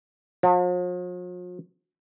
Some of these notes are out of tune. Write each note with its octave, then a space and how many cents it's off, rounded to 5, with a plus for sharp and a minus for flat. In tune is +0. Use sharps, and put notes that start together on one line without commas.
F3 +45